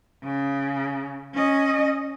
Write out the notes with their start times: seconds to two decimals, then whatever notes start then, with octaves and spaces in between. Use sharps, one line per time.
0.24 C#3
1.34 C#4 D#5